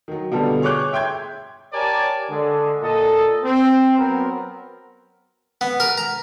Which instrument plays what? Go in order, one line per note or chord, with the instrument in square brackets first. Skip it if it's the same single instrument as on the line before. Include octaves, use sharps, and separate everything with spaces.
[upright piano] D#3 F#3
B2 D3 G3 B3 F4 A4
G#4 C#5 C#6 D6 F#6 G6
E5 G5 C6 G6 G#6
[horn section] G4 A#4 C#5 D5 G#5 A5
D3 G#3
A#2 A4 D#5
C4
F#3 B3 C4 A#4
[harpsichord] B3
A#4
A#5